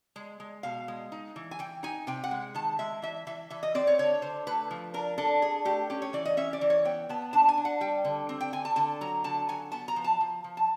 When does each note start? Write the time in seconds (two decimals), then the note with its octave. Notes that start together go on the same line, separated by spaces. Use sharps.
0.16 G#3
0.40 G#3
0.63 B2 F5
0.88 G#3
1.12 D#4
1.36 E3
1.51 G#5
1.59 E3 G5
1.83 D#4 G#5
2.07 C3 G5
2.24 F#5
2.31 G#3
2.54 D#3 A5
2.79 G#3 E5
3.02 E3 E5
3.27 E3 E5
3.50 E3 E5
3.63 D#5
3.75 C4 D5
3.87 C#5
3.99 D3 C#5
4.22 D3 C5
4.47 A3 B4
4.71 F3
4.94 D4 A#4
5.18 D4 A4
5.42 D4 G#4
5.65 A3 G4
5.90 C#4 G4
6.02 C#5
6.13 E3 D5
6.25 D#5
6.37 C#4 E5
6.53 D5
6.61 E3
6.70 C#5
6.85 B3 G5
7.09 B3 A5
7.33 D4 A5
7.49 G#5
7.57 D4
7.65 F#5
7.81 G3 G5
8.05 D3
8.29 C4
8.41 G5
8.53 D3 G#5
8.65 A5
8.76 D3 A5
9.01 F#3 A#5
9.24 D3 A5
9.49 F#3 G#5
9.72 B3 A5
9.88 A#5
9.96 F3
10.04 A5
10.21 F3
10.44 F3
10.57 A5